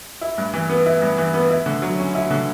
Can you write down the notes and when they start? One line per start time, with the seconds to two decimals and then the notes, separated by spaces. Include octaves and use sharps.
0.21 E4
0.38 G2
0.54 E3
0.70 B3
0.86 E4
1.02 G2
1.18 E3
1.34 B3
1.50 E4
1.66 D3
1.82 F#3
1.99 C#4
2.15 E4
2.31 D3